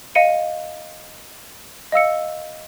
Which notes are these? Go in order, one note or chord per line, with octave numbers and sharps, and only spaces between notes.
D#5 F5 C#7 D#7
D#5 F5 E6 C#7